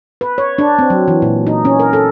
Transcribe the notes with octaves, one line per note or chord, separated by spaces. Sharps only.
B4
C#5
D4
C4
F#3
E3
A#2
D#4
C#4
A#4
A4